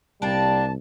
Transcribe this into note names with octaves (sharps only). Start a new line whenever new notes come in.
C2 G3 A#3 D4 A5